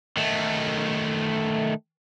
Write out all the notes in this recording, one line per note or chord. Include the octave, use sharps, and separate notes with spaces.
D#3 A3